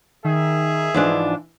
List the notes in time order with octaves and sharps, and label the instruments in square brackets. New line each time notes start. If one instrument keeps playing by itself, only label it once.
[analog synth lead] D#3 [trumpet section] G#4 E5
[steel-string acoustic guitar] G#2 F3 D4 [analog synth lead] E3